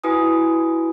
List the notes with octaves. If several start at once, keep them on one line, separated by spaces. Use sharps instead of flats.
E4 F#4 B4 G#5 D#6